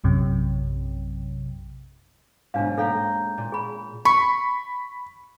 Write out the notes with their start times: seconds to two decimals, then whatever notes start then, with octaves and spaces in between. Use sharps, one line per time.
0.04 A#1 F#2 C3
2.54 B1 G#2 D4 F5
2.78 A#3 A4 F5 G5 A#5
3.38 A#2
3.52 G#4 B5
4.05 B5 C#6